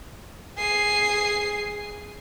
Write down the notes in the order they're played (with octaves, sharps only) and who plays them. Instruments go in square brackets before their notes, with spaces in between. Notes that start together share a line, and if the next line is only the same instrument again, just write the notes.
[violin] G#4 C7